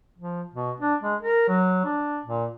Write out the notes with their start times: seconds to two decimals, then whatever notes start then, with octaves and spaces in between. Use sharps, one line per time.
0.18 F3
0.54 B2
0.81 D4
1.03 G#3
1.21 A#4
1.48 F#3
1.85 D4
2.26 A#2